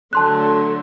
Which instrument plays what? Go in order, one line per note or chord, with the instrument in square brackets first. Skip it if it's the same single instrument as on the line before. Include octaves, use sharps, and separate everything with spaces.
[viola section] D3 F#3 A3 [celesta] A5 C6 F#6